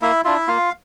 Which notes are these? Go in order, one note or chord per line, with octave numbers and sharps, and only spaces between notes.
A#3 E4 E5
D4 E4 F4 E5
A#3 F4 F5